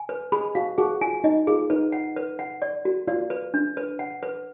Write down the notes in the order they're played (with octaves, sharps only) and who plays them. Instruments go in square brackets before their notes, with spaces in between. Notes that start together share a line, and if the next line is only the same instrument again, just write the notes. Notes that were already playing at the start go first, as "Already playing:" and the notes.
Already playing: [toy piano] G#5
B4
[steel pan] G#4 [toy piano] B5
[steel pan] F#4 [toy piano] F5
[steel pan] F#4 [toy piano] G#4
[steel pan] F4 [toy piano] G#5
[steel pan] D#4 [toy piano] D#5
[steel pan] F4 [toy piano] G#4
[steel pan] D#4 [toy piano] B4
[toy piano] F#5
B4
F#5
D5
F#4
[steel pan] F4 [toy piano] D5
[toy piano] B4
D4
B4
F#5
B4